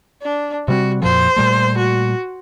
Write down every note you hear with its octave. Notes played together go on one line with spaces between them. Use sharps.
D4
C3 G3 C4 F#4
F2 A#2 F3 C5
A#2 G3 A3
F#4